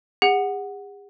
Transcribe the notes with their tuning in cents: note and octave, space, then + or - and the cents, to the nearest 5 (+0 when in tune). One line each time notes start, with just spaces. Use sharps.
G#4 -45 F#5 +0